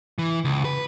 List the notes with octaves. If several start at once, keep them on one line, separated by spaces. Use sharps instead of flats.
E3
C#2
B4